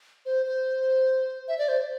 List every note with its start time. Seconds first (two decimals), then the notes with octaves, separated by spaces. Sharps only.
0.26 C5
0.46 C5
1.48 E5
1.58 D5
1.68 C5